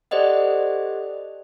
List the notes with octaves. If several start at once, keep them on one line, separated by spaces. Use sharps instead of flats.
G4 A4 C5 D5 D#5 F#5